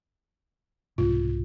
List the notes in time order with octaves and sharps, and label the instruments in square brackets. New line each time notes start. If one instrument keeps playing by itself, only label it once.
[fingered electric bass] C2 G#2 B2 [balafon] F4